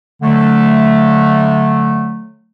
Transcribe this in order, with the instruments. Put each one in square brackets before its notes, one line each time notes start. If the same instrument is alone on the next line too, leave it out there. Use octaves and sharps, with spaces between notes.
[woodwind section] D3 F#3 A3